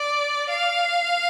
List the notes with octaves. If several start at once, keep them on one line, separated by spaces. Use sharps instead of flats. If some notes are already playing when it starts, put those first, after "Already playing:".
Already playing: D5
F5